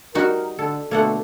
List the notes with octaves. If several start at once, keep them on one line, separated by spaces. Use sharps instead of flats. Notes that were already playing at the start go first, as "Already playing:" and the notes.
G3 D#4 F#4 A#4
D3 A4
B2 D3 A3 A#3 A4 F#5